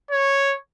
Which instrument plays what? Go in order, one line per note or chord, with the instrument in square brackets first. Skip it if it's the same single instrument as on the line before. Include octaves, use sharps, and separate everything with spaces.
[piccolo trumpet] C#5